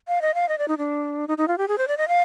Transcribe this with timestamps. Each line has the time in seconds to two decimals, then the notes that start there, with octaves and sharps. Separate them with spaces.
0.08 F5
0.22 D#5
0.34 F5
0.49 D#5
0.58 D5
0.68 D#4
0.78 D4
1.28 D#4
1.38 D#4
1.48 F4
1.58 G4
1.68 G#4
1.78 C5
1.88 D5
1.97 D#5
2.08 F5